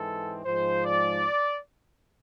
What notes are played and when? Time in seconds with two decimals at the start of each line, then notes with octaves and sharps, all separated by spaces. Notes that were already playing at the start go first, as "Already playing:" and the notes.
Already playing: G#2 E3 G#3 C4 A4
0.45 G#2 F3 G#3 C5
0.85 D5